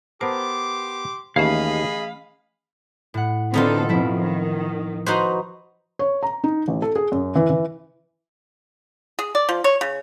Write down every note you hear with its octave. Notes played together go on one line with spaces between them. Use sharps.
B3 G4 A#4 C5 A5 C6 D6
D#2 E3 A3 C#4 G#4 D#5 F5 B5
A2 F#5
D3 B3 C4 D#4 F4 A4
F2 B2 F3 E4 E5
D#3
D#4 F#4 B4 C5 A#5
C#5
A#5
D#4
A1
A4
G#4
F#2
E3
E3
G#4
D5
F3
C#5
C#3